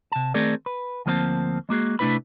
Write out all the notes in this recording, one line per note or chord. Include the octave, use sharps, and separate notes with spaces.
C3 A5
D#3 A3 C4 G#4 A#4 D5
B4
D2 F3 A#3 C4 A#4 A5
G#3 A#3 F#4 G#4
C3 A3 D4 E4 B4 B5